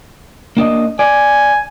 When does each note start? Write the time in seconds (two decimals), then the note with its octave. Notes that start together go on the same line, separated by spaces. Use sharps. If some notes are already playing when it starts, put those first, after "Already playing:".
0.57 A#3 D4 D#5
0.99 D5 G#5